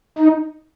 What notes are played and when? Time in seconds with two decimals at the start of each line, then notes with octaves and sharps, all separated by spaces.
0.18 D#4